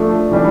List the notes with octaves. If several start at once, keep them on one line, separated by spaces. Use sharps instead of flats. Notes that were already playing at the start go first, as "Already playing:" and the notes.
Already playing: F3 A3 D4
E3 G3 D4